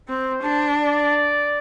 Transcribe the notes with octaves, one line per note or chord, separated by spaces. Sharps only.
C4 C5
D4
D5